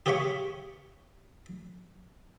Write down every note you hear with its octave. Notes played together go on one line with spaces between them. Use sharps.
G4 G#4 C#5 F5 B5 C#6